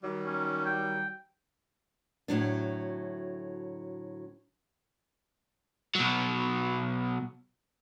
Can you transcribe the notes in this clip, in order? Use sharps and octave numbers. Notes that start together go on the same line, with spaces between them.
D#3 F#3 G3
C#4
G5
D2 A2 F#3 D4
B2 F#3